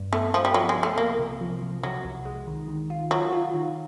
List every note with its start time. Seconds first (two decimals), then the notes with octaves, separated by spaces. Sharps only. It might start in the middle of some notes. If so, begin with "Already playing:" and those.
Already playing: G2
0.13 A3 B3
0.33 F3 B3
0.45 G3
0.54 F3 F#3
0.69 G#3
0.76 C2
0.83 A3
0.97 C2 A#3
1.19 C3
1.41 F3
1.62 F3
1.83 C3 F#3
2.05 C2
2.25 G#3
2.47 D#3
2.68 D#3
2.90 F4
3.11 F#3 F4
3.32 F4
3.54 D#3